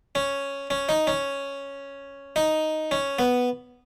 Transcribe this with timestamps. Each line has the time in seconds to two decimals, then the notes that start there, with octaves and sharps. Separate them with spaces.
0.15 C#4
0.70 C#4
0.89 D#4
1.07 C#4
2.36 D#4
2.91 C#4
3.19 B3